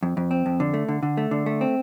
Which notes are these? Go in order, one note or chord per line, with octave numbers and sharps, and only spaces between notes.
F2
F2
C4
F2
D3
A3
D3
D3
A3
D3
A3
C4